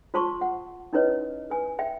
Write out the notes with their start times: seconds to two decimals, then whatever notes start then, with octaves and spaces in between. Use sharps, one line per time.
0.14 F4 C5 A5 C6 C#6
0.41 F#5
0.93 C#4 D#4 E4 B4 C#5 D#5
1.50 B4 G#5
1.79 E5 G5